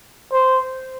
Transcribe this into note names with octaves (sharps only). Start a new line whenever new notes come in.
C5